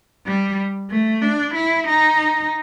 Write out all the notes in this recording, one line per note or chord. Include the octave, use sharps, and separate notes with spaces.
G3
A3
D4
E4
D#4